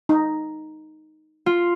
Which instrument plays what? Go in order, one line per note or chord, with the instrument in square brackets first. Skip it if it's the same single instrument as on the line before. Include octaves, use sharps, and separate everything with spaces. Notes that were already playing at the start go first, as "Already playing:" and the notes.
[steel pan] D#4
[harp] F4